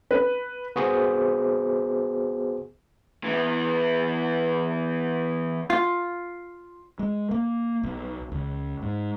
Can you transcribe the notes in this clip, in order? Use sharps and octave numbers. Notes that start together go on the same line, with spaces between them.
B4
B3 F#4 G#4 C5
E3 B3
F4
G#3
A#3
B1
C#2
G#2